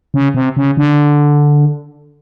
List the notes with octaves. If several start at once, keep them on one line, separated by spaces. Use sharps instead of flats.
C#3
C3
C#3
D3